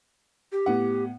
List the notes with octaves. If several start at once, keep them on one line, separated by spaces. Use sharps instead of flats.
G4
A2 B3 F#5